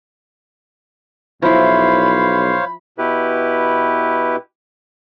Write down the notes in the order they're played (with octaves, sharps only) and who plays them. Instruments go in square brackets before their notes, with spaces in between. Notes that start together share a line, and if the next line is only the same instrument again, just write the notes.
[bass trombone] B1 [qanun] F3 E4 [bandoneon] C5 C#5 F5 [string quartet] B5
[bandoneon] B2 E4 G4 B4